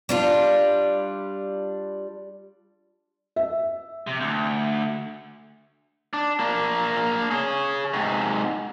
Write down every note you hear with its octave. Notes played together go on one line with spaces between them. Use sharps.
G3 D4 F4
E5
C3
D2
D4
A#3 D4
G#4 C#5
G#2 C3